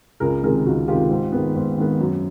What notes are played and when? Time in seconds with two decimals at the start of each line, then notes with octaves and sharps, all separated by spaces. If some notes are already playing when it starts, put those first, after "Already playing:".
0.20 C#2 G#4 A#4
0.43 C3 D#3 G#3 G#4 A#4
0.66 C#2 F#4
0.88 C3 D#3 G#3 F4 G4
1.10 G#2
1.32 D#3 G#3 B3
1.55 G#2
1.78 D#3 G#3 B3
2.00 F#2